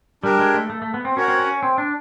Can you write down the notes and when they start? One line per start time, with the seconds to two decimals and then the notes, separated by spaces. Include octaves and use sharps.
0.24 G3 D4 G4 A#4
0.39 G#3
0.54 A3
0.70 A3
0.82 A3
0.94 B3
1.05 C4
1.17 C#4 F#4 A#4 C#5 F#5
1.28 C4
1.40 C#4
1.63 C4
1.78 D4